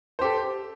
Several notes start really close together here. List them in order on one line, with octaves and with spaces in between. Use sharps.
C5 G4 A4